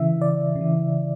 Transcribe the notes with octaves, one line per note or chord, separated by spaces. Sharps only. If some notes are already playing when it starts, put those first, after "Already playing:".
Already playing: C#3 E3 E5
D5
C#3
E3